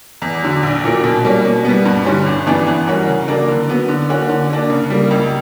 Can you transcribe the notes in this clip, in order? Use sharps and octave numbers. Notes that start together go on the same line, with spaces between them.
E2
D3 F#3
A#1
A#2 F#3 A#3
B2
G3 A#3 C#4
B2
G3 B3
G2
D3 G3 C#4
G1
F#2 E3 B3 D4
E3
G3 C#4 F#4 A#4
C#3
F#3 A#3 D4 A#4
D3
F#3 B3 F#4
D3
A#3 C#4 F#4
D3
A#3 D4
C#3
G3 A#3
C#2